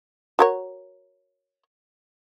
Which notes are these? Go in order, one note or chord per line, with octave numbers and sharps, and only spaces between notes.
F#4 A#4 C#5